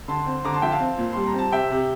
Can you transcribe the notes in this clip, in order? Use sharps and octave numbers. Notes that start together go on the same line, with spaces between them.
D3 A5 C6
C4
D3 A#5 D6
A5 C6
F3 E5 G5
F5 A5
C4
A#2
G3 C6
A#5
C4 A5
C3 E5 G5
C3